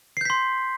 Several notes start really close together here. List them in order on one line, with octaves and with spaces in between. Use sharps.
C7 G6 B6 C6